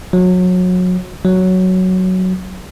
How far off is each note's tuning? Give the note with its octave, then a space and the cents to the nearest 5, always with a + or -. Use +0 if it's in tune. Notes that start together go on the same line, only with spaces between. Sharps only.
F#3 -25
F#3 +5